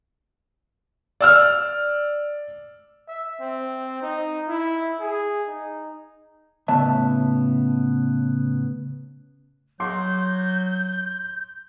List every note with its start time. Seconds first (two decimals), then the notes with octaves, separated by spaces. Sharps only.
1.21 D5 E6 F6
3.08 E5
3.41 C4
4.02 D#4
4.48 E4
5.00 G#4
5.47 D#4
6.68 A2 C#3 B3 E5 A5
9.80 F#3 C6 D6 G6